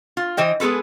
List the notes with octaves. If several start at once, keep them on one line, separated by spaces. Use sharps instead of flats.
F4
E3 C5 D#5 G5
G#3 B3 G#4 A4 B4